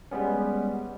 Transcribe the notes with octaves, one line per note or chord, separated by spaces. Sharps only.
G3 G#3 B3 C#4